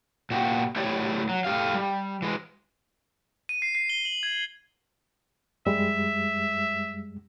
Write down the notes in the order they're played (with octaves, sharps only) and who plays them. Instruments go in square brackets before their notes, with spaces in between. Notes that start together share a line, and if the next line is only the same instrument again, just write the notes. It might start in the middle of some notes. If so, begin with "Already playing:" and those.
[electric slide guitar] A#2 F#4 G4
A3 E4 G4 C#5 D5
F#3
A2 G4 F5
G3
E3 G#3
[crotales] D#7
C7
C7
G7
F#7
G#6
[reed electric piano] F#2 G3 G#3 [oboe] E5